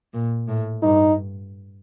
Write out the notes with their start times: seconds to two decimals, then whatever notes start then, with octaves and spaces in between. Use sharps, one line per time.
0.14 A#2
0.48 A2
0.82 G2 D#4